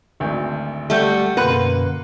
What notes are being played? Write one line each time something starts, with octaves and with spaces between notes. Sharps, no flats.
G#1 D2
G3 A3 A4 F#5
F#2 B2 D3 A#3 B4 F#5 C6